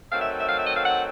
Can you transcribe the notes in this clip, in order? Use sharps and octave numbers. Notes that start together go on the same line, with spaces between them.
D#3 F#3 A3 C4 F5
E5
E5
F5
E5
D#5
F5
F#5